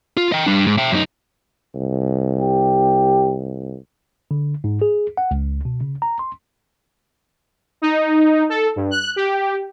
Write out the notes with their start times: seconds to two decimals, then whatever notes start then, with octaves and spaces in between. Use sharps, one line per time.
0.17 F4
0.32 D#5 G5
0.46 G3 D4
0.67 G#2
0.78 E5 G5
0.92 F#2 D#4
1.75 C2
2.41 G4
4.31 D3
4.64 G#2
4.82 G#4
5.17 F#5
5.31 C#2
5.65 B2
5.81 C#3
6.02 A#5
6.19 C6
7.82 D#4
8.49 A4
8.76 G2
8.91 F#6
9.16 G4